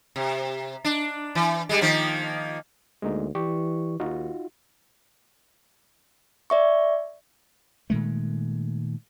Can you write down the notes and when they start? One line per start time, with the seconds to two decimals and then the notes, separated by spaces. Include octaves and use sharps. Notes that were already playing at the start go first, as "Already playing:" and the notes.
0.16 C3
0.85 D4
1.35 E3
1.69 G3 G#3
1.81 D#3 F3 A#3
3.02 D2 G#3 A#3 D#4
3.35 E3 G4 D5 C#6
4.00 D#2 D#4 F4 F#4
6.50 D5 E5 C#6
7.90 A#2 D#3 G#3 A3